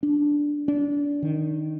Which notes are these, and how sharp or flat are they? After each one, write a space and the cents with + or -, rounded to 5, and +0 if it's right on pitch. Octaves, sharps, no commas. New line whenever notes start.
D4 +0
D4 -25
D#3 -5